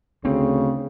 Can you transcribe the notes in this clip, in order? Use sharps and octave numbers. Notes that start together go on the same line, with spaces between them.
D2 C#3 C4